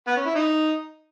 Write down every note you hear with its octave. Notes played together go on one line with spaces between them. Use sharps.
B3
C#4
E4
D#4